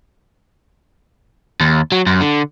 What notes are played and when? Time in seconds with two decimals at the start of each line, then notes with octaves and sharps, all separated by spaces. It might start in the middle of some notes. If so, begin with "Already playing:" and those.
1.61 D#2
1.92 F#3
2.07 F#2
2.21 D3